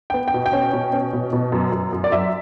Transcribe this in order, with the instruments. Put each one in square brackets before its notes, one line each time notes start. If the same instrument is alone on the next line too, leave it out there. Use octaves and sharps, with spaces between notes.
[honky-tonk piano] B3 G5
G5
B2
G5
C#4
B2
C#4
B2
B2
F#2
F#2
F#2
D5
F#2 E5